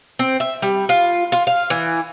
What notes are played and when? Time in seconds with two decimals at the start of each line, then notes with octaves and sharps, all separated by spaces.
0.19 C4
0.40 E5
0.62 G3
0.89 F4
1.32 F4
1.47 F5
1.70 E3